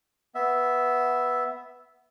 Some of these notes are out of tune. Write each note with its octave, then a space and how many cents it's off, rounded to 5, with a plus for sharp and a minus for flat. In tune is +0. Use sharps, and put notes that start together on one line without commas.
B3 +0 E5 +0